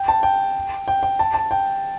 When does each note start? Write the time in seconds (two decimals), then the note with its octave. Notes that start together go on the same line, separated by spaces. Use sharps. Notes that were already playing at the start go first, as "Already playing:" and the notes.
Already playing: G5
0.08 A5
0.23 G5
0.88 G5
1.03 G5
1.19 A5
1.34 A5
1.51 G5